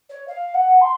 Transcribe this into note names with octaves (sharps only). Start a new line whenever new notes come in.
C#5
F5
F#5
C6